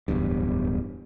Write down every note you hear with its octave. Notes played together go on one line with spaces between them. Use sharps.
D1 E2 G2